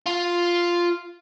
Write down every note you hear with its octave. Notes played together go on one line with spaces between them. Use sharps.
F4